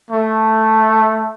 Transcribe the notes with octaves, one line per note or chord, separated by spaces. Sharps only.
A3